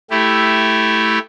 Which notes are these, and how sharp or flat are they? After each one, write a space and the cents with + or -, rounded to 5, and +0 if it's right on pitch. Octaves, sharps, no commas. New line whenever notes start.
A3 +0 E4 +0 G4 +0